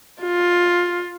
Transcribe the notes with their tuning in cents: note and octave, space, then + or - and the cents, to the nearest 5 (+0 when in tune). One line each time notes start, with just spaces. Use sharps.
F4 +10